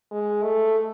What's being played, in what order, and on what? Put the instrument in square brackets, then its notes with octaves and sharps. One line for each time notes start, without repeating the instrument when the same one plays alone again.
[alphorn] G#3
A3